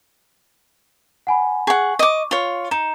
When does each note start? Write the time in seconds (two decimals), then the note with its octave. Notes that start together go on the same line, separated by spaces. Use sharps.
1.27 F#5 G#5 B5
1.67 G#4 F#5 C#6
1.99 D#5 D6
2.31 F4 C#5
2.71 D#4 E7